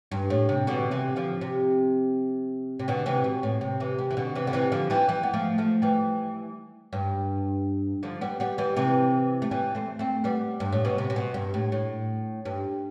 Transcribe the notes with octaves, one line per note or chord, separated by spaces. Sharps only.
G2
A2
C3
B2 D3
C3 E3
D3 F3
C3
C3
B2 D3
C3 E3
B2
A2
C3
C3 E3
C3
E3
B2 D3
C3 E3
D3
C3 E3
D3 F3
E3 G3
E3 G3
B3
F3 A3
F3 A3
E3 G3
G2
D3 F3
G3 B3
G3 B3
E3 G3
C3 E3
A3
E3 G3
A3 C4
A3 C4
G3 B3
G2
A2
B2
C3
C3
B2
G2
A2
A2
G2